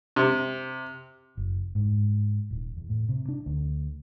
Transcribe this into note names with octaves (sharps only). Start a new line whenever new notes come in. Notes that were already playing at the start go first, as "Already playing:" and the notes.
C3
F#1
G#2
D#1
E2
A2
C3
D4
D2